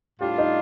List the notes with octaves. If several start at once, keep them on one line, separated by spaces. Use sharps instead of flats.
A2 G3 D4 F4 G4
D#4